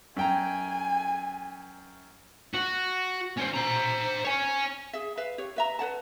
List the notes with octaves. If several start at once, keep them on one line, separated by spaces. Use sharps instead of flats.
F#2 G5 G#5 A#5
F#4
C#4 C5
C5 A#5
C#5 G#5
G#4 E5
B4 E5 F5
G4 C#5
B4 E5 A#5
B4 C#5 F#5 A5